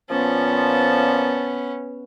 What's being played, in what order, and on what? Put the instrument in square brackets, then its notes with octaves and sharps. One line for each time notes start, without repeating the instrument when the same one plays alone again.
[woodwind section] A#2 F3 A5 [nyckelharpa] B3 C#4